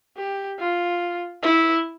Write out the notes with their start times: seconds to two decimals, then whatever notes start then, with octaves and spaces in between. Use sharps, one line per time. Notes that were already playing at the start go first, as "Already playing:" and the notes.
0.17 G4
0.59 F4
1.43 E4